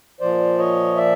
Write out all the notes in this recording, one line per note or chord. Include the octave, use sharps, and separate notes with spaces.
A#2 F3 C5 D5
C#5 D#5
D5 E5